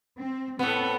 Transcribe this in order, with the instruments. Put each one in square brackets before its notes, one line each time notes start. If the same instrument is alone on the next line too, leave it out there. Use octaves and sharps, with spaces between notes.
[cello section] C4
[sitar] A2 B3 [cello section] C4 A4